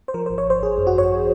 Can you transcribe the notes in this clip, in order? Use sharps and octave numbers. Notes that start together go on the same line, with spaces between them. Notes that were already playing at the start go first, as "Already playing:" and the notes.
C5
F3 A#4
C5
G#1
C#5
G#1 C5
G#1 G#4
F#2
F#4
G#1 C#5